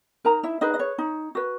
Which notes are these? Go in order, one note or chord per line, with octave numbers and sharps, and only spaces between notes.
D#4 A#4 A#5
E4 E5
D#4 G#4 B4 D#5
D#5
C#5
D#4
F#4 B4